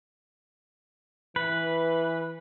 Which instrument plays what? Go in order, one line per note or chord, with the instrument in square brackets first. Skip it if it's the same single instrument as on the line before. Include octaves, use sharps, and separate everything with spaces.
[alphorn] E3 [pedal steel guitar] B4